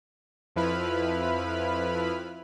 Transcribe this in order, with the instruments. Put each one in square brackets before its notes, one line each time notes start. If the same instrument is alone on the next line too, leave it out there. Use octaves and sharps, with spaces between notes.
[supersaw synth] F2 F3 E4 B4 B5 F6